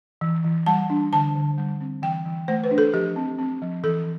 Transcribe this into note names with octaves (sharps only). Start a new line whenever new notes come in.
E3
E3
G3 A5
D4
D3 A5
D3
G3
C4
E3 G5
E3
A3 C5
B4
D4
A4
F3 G4
C4
C4
F3
E3 A4